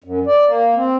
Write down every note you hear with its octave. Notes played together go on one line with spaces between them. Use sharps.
F#2
D5
A#3
C4